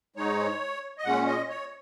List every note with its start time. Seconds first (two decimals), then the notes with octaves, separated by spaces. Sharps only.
0.16 G#2 G#3 D#4 C#5
0.98 D#5
1.05 A#2 G#3 C#4 F#5
1.26 D#5
1.49 C#5